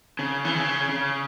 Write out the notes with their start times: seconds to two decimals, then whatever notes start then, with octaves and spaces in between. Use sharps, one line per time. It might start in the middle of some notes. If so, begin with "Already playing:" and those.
0.19 C#3
0.45 E3
0.54 C#3
0.89 C#3